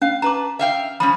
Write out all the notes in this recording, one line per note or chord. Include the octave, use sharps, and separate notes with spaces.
C#4 F5
B4 A5 A#5 D6
E5 F5 G5
F3 G3 C#4 B5